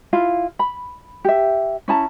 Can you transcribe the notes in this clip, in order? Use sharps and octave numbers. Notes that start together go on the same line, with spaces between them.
E4 F4 F5
B5
G4 E5
C#4 E4 A5 A#5